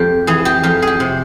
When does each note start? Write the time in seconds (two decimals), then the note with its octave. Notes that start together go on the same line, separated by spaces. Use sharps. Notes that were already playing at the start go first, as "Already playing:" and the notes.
Already playing: F2 G4
0.27 E3 G#4
0.45 G4
0.63 F2 G4
0.82 G#4
0.87 G4
1.00 C3